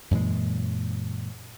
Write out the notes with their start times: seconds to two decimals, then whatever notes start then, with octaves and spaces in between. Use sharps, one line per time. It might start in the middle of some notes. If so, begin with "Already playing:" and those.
0.11 F#2 A#2 E3 G#3